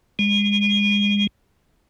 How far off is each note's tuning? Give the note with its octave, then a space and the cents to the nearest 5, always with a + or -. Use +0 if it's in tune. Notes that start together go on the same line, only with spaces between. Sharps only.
G#3 -30